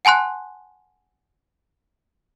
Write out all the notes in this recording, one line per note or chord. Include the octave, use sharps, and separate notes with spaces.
F#5 G#5 A5 C6 F#6